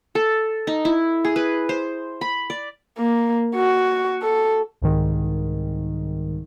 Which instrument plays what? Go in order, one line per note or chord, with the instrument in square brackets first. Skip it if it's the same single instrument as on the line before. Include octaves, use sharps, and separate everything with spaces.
[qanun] A4
D#4
E4
G#4
B4
C5
B5
D5
[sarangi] A#3
F#4
A4
[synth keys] C2 G#2 D#3